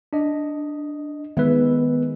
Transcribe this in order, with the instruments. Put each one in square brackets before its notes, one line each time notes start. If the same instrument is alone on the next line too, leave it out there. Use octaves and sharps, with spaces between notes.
[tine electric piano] D4 D#5
[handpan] D#3 G#3 E5 [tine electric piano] B3 B4